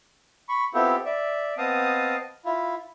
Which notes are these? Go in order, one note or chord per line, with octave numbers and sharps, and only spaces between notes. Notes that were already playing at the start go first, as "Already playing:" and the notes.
B5 C#6
B3 C4 E4 F4 G4 A4
D5 E5
B3 C4 D#5 F5 A5 D#6
E4 F4